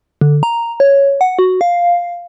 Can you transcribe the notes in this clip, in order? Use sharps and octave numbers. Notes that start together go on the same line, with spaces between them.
D3
A#5
C#5
F#5
F#4
F5